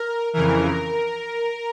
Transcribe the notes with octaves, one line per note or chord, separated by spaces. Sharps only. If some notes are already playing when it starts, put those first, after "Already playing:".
Already playing: A#4
F2 C#3 E3 A#4